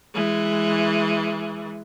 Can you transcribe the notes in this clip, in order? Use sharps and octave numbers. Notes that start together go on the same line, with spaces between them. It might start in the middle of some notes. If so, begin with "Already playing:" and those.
E3 G#3